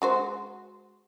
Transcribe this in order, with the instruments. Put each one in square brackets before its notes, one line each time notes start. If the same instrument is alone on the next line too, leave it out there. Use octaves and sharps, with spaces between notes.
[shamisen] G#3 F#4 C5